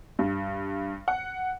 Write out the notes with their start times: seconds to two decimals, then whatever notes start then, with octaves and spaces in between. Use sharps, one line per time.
0.19 G2
1.08 F#5